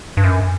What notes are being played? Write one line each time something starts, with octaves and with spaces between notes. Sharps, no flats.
G2
F#2